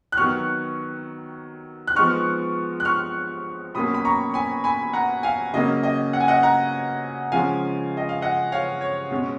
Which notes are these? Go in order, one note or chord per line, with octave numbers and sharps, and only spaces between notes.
F#6
D#3 F#3 B3 C#6 F6
F#6
F3 G#3 B3 D#4 C#6 F6
F#6
C#6 F6
B2 F#3 A#3 C#4 B5 D#6
B5
A#5 C#6
G#5 B5
G#5 B5
F#5 A#5
F5 G#5
C#3 F#3 A#3 C#4 D#5
D#5
F#5
G#5
D#5 F#5
F#5 A#5
C#3 F3 G#3 C#4 F5 G#5
D#5
F5
D#5 F#5
C#5 F5
C#5
B2 G#3 C#4 C#5